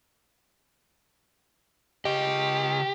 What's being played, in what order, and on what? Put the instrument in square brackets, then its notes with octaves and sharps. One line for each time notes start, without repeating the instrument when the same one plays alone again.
[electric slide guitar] C#3 D#5 [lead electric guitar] G4